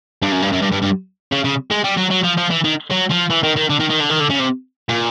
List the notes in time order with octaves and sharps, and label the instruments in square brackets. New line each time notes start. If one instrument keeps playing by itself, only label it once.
[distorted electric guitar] G2
F#2
G2
F#2
G2
G2
G2
C#3
C#3
G#3
G3
F#3
F#3
F3
F3
E3
D#3
F#3
F3
E3
D#3
D#3
D3
D#3
D#3
D3
D#3
D3
C#3
C3
A#2